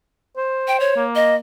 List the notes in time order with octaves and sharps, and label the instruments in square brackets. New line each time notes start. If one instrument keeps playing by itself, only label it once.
[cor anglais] C5
[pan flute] G5
C#5
[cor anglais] A#3
[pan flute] D#5